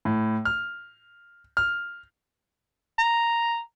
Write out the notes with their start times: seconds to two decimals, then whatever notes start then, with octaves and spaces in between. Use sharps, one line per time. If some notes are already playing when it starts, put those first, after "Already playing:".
0.05 A2
0.45 F6
1.57 F6
2.99 A#5